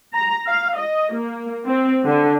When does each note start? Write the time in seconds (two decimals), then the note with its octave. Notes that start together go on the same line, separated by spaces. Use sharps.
0.14 A#5
0.47 F5
0.76 D#5
1.13 A#3
1.65 C4
2.05 D3